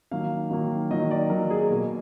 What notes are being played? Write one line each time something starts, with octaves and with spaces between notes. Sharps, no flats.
D#3 F#3 A#3 F5
D#3 F#3 A#3
D#3 F#3 A#3 D#5
D5
D#3 F#3 A#3 A#4
G#4
B2 A#3